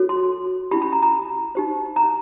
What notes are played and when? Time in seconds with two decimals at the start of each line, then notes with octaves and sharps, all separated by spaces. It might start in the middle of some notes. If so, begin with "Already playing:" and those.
Already playing: F#4 A4 C#5
0.09 C6
0.71 C#4 E4 G4 B5
0.82 B5
0.93 A#5
1.03 A#5
1.55 D#4 G4 C5
1.96 A#5